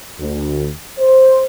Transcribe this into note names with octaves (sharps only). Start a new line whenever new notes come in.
D2
C5